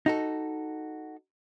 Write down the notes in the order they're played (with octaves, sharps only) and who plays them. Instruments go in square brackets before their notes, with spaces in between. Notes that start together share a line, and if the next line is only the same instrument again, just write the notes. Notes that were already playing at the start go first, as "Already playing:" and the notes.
[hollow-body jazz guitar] D#4 F#4 A4